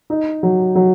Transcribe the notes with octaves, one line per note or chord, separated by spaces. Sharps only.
D#4
F#3
F#3